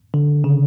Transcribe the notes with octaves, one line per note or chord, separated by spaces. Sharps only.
D3
C#3